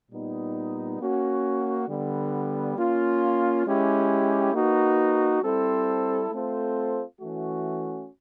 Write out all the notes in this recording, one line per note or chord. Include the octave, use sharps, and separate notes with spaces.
A#2 G3 B3 D#4
A#3 C#4 F#4
D3 G3 B3
A#3 C#4 F4
G#3 C#4 E4 G4
A#3 D#4 F#4 B4
G3 C4 E4 A4 C5
A3 C4 F4 A4 C5
E3 A3 C#4 F#4